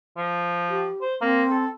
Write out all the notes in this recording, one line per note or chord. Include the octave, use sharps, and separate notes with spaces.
F3
G4
C5
A#3 C4
A4